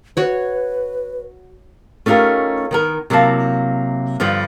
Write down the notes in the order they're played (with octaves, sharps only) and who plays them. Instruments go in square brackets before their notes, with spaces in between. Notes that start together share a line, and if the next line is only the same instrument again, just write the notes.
[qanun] F#4 C#5 [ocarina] B4
[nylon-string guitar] A3 C#4 D#4 F4 G4 A#4
D#3 B3 A#4
C3 F#3 A#3 E4 F5 A5
G2 D3 F3 G3 B3